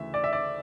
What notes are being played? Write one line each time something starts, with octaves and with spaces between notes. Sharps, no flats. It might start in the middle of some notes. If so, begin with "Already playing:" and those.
Already playing: D2 C#3 E3 E5
D5
E5
D5